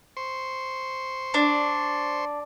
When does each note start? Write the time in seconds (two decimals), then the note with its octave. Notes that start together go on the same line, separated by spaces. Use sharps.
0.17 C5 C6 C#6
1.34 D4